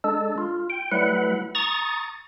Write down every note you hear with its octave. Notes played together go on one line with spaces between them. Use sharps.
G#3 D4 A4
F4
G5
F#3 G3 A3 E4 B4 F#5
A#5 C#6 D#6 A6